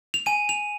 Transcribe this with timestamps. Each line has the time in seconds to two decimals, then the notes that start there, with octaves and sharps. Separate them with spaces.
0.14 F7
0.26 G#5 D#7
0.49 F7